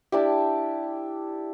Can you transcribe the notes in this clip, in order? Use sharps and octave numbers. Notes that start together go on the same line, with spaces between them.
D4 E4 G4